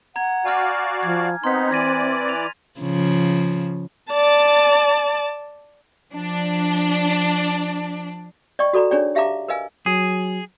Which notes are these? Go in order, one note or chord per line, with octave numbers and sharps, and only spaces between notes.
F#5 A#5 G#6
F#4 D5 F5 G#5 D6 F6
F3 G#6
B3 C4 D#4 C6 B6
E3 D5 G#6 A#6 D#7
A6 F7
C#3 F3
D5 A5
F3 D4
D5 D#5 G5 C#6
F#4 A4 D5 A#5 B5
D4 D#4 G#4 C#5 D5 G5
G4 E5 F5 A5 A#5 D6
A#4 B4 D#5 F5 G#5
F#3 G#4